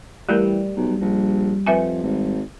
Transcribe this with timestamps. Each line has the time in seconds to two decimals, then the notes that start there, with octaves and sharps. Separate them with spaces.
0.29 E3 G3 A3 G4 A#4
0.76 B1
1.01 A#1
1.66 F2 B4 E5 G#5
2.03 G#1